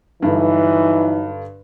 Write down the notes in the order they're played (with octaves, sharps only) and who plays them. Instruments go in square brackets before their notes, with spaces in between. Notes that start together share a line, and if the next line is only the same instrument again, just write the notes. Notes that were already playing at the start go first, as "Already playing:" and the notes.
[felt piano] G2 D3 [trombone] E3 [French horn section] F#3 D4 D#4